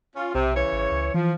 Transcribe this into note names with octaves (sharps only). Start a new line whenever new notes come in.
C#4 F4
B1 C3
C#3 E3 C#5
G#1
C#2
E3 F3